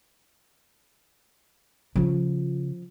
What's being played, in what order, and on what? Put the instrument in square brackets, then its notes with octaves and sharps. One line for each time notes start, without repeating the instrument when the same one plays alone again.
[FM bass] C#3 [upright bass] F3 F4